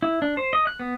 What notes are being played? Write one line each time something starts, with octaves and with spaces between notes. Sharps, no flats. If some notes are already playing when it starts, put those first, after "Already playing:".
E4
D4
C5
D#5
F#6
B3